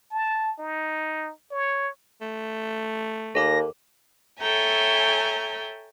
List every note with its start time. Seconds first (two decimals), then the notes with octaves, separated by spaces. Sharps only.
0.11 A5
0.59 D#4
1.51 C#5
2.21 A3
3.35 D#2 A4 A#4 D6 A#6
4.39 A4 C#5 E5 G5 G#5 A#5